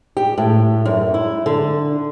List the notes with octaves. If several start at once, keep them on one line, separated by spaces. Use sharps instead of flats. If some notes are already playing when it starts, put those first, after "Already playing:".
G4
A2
F#2
E4
D3